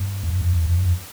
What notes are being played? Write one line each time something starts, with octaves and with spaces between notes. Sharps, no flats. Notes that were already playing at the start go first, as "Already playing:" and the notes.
Already playing: G2
F2
F#2
F2
E2
F2
F#2
F2